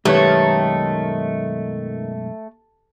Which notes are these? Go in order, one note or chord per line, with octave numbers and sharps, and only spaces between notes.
B1 F#2 D#3 G#3 A3 G4 B4 C#5